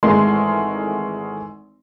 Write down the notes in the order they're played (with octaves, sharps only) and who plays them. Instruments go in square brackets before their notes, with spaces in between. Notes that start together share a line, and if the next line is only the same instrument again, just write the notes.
[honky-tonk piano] G#1 E3 G#3 A3 A#4 C6